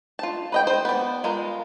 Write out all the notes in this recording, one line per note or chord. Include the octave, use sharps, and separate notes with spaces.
F4 A5
B4 D#5 G5
C5
B3 D5
G#3 F4 A#4